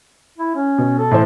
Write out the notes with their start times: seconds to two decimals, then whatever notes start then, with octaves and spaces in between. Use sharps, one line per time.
0.38 E4
0.55 C#4
0.78 B2
0.99 A4
1.11 A2 E3 C5